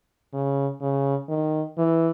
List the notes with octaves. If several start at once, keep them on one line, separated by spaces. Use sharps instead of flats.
C#3
C#3
D#3
E3